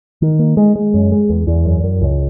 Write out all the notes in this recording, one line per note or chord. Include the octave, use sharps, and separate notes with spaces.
D#3
A#3
G#3
G#3
F#2
G#3
E2
E2
F#2
F#2
C#2